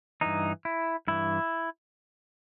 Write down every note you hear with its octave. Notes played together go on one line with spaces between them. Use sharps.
G2 E3 D#4
E4
G2 E3 E4